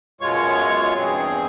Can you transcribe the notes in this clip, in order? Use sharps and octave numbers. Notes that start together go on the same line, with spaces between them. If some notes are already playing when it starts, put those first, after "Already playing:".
F#2 B2 G#3 F4 C#5 C#6
E2 G2 C4 G#4